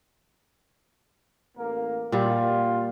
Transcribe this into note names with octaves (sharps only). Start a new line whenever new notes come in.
A1 A#3 A#4
A#2 G3 F4